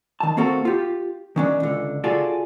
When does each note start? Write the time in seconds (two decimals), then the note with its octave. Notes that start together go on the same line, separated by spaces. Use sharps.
0.20 D#3 A5
0.37 A#3 C4 F#4 A4 A#4
0.65 F4 G4
1.36 D#3 C#4 D4
1.60 C#2 D3
2.04 F4 F#4 G#4 A4 D5